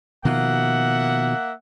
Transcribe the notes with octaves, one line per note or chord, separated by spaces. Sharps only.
B2 D#3 F3 A#3 E5 F#5